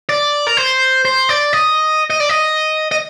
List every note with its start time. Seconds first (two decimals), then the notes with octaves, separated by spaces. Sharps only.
0.09 D5
0.47 A#4
0.57 C5
1.05 C5
1.29 D5
1.53 D#5
2.10 D#5
2.20 D5
2.29 D#5
2.91 D#5